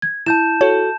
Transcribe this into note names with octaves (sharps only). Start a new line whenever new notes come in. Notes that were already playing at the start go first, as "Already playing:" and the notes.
G#6
E4 A5 G6 E7
F#4 A4 C#5